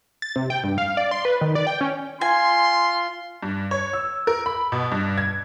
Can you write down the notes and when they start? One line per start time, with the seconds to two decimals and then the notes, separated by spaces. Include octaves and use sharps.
0.22 A6
0.36 C3
0.50 G5
0.64 G2
0.78 F5
0.97 D5
1.11 C6
1.25 B4
1.41 D#3
1.55 D5
1.67 G5
1.81 C#4
2.21 F4 G#5 C6
3.43 G2
3.71 C#5
3.93 E6
4.27 A#4
4.46 B5
4.72 B2
4.92 G2
5.18 G#6